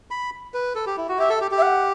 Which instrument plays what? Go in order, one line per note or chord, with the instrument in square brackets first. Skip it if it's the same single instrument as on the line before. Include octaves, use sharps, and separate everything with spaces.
[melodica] B5
B4
A4
G4
E4
F#4
[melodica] G4 [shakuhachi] E5
[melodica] A4
G4
G4
[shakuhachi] E5
F#5